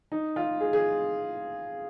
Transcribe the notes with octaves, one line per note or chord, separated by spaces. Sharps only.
D#4
F4
G#4
G#4